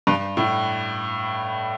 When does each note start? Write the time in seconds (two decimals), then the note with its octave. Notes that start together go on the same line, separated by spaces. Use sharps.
0.07 G2
0.37 A2